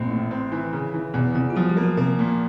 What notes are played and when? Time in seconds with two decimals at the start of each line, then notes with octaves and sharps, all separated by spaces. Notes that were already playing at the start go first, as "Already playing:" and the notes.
Already playing: A1 A#2 A#3 C4
0.10 A2
0.31 C4
0.52 E3
0.73 C#3
0.94 E3
1.14 E2 B2 B3
1.35 E2 C3 C4
1.50 F4
1.56 F3 F#3 F#4
1.69 G3 G4
1.77 A#3
1.83 F#3 F#4
1.97 C3 A#3 C4
2.19 A#2